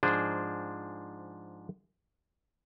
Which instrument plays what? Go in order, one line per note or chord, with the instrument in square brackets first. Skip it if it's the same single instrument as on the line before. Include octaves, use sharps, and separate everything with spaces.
[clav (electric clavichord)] G#2 F3 D4 G#4 C5